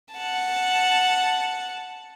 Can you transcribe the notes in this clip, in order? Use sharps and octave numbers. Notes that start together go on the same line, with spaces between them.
F#5 A5